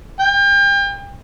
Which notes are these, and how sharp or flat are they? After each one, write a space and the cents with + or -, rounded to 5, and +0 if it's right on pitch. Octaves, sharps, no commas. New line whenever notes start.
G5 +35